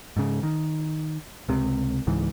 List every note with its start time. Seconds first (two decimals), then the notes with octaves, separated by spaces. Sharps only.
0.17 G#2 C#3
0.43 D#3
1.49 C#2 C3
2.07 C#2 G#2 E3